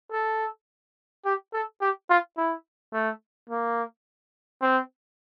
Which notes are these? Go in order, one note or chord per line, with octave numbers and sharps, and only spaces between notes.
A4
G4
A4
G4
F4
E4
A3
A#3
C4